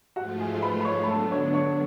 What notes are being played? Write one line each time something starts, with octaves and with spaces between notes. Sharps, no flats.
G#2 F3 A3 F4 F#4 F#5
G#4 G#5
B4 B5
B5
C#5 C#6
B5
D3 F#3 B3 D4 A4 A5
C#5 C#6
C#5 C#6